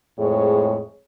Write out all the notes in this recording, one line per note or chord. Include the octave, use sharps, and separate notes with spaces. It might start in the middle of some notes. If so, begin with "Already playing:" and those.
F2 A2 G#3 G#4 C5 C#5